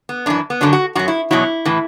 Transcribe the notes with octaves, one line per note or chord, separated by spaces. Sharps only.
B3
F#2 E3 D4
B3
F#2 D3 F#3 D4
F#4
F#2 F#3 F#4
E4
E2 B2 F#3 E4
A2 E3